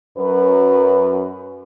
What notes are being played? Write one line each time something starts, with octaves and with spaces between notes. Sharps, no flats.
F#2 B4